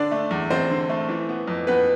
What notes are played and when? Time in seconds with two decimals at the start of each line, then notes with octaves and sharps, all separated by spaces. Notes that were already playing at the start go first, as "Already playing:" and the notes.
Already playing: D3 D4 D5
0.11 A3
0.31 E2
0.51 E2 C4 C5
0.70 D3
0.89 A3
1.09 E3
1.29 B3
1.48 F2
1.67 F2 B3 B4